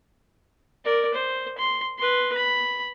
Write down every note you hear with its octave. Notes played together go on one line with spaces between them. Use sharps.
A#4 D5
C5
C6
B4 C6
B5